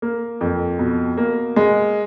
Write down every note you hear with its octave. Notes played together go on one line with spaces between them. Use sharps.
A#3
F2
B2
A#3
G#3